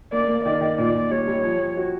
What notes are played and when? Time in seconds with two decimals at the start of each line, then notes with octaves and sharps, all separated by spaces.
0.12 A#3 D5
0.28 A#3
0.45 D#3 D5
0.61 D#3
0.78 A#2 D5
0.94 A#2
1.11 G3 C#5
1.28 G3
1.44 F3
1.59 F3
1.77 F#4